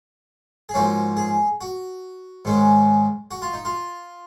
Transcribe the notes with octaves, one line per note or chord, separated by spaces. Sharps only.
G#4
G#2 F3 A#3 C#4 F#4
G#4
F#4
G#2 D#3 G#3 C#4
F#4
F4
D#4
F4